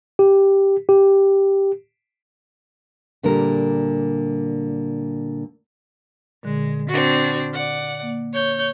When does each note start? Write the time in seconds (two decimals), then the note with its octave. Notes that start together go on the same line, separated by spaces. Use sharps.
0.19 G4
0.89 G4
3.23 A#2 D3 G3 A#4
6.43 A#2 D3 G#3
6.88 C4 D4 F#4
7.53 D5 F#5
8.02 A#3
8.33 C#5 G6